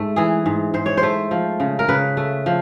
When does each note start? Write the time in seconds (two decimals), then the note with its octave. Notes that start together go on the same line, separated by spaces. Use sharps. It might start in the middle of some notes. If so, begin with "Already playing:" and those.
Already playing: G#2 A3
0.16 E3 G#4
0.46 G#2
0.74 G#2 C5
0.86 C#5
0.97 C5
1.03 A3
1.31 F3
1.60 C#3
1.79 A#4
1.89 C#3 B4
2.17 A3
2.46 F3